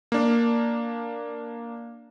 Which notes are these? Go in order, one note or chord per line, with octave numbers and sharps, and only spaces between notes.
A#3 D4